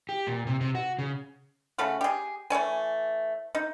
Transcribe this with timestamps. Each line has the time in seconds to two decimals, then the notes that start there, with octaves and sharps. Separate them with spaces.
0.09 G4
0.27 A#2
0.47 C3
0.61 C3
0.75 F#4
0.99 C#3
1.78 C#3 A3 C#4 F#4
2.01 G4 G#4
2.50 E3 A3 C#5 G#5
3.55 D#4